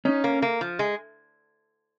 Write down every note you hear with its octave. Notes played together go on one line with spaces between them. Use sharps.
C#4 D#4
A#3
A#3
F3
G#3